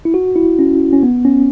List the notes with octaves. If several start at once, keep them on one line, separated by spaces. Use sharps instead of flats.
E4
F#4
E4
C#4
C#4
B3
C#4